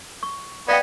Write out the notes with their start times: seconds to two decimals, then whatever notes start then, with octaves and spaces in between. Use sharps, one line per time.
0.23 C#6
0.68 B3 D5 D#5 F5 G5